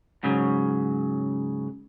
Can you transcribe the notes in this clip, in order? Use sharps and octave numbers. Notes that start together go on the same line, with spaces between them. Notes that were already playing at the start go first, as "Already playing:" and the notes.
G#2 C#3 F#3